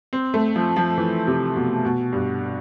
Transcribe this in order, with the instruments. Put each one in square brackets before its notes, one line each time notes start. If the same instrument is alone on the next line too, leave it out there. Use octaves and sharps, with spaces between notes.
[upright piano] C4
A3
F3
F3
E3
C3
B2
B2
G2